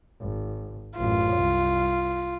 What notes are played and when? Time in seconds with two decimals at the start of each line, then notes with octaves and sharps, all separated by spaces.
0.20 G#1
0.98 A1 F#2 F4
1.35 C2